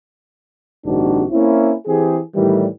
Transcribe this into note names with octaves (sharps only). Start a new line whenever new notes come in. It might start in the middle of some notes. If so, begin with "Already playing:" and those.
A#1 G#2 C3 D#3 D4 F#4
A#3 C4 C#4 E4
E3 C4 G4 G#4
A2 D#3 E3 G3